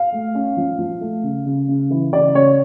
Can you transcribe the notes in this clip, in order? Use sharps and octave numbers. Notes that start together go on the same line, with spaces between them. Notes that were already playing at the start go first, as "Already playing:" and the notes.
Already playing: F5
A3
C#4
F3
F3
A3
C#3
C#3
C#3
E3
C#3 D5
C#3 C#5